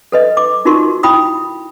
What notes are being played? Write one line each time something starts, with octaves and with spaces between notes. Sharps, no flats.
A4 B4 D#5
D6
D#4 F4 F#4 A#4 C6 C#6
E4 G5 B5 D#6